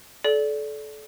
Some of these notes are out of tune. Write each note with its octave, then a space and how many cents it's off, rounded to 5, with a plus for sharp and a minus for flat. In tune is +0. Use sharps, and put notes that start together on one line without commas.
A4 -30 D5 -15